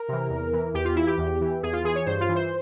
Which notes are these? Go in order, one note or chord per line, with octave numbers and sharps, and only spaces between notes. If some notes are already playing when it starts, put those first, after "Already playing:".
Already playing: A#4
C3 E3
E2
E3
E2 G4
F4
E3 E4
G4
E2
E3
E2 G#4
F4
E3 G#4
C#5
G2 C5
F4
E3
C5